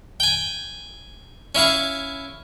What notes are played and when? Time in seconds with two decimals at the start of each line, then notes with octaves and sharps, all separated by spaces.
0.20 G5 G#5
1.55 C#4 E4 F5 C#6